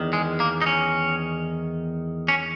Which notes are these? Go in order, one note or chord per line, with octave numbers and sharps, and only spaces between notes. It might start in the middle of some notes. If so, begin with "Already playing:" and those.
Already playing: E2 D#3
G#3
A#3
D#4
C#4
C#4